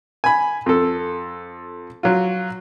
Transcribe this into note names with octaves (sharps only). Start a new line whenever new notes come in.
G#5 B5
F2 A4
F#3 F4